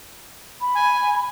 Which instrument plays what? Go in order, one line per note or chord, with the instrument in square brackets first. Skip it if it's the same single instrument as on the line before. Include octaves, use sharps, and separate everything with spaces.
[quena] B5
[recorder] G#5